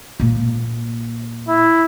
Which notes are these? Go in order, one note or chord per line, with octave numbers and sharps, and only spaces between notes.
A#2 A#3
E4